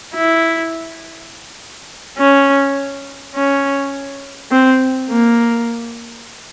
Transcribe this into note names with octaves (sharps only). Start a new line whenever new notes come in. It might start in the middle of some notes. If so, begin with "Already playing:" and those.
E4
C#4
C#4
C4
A#3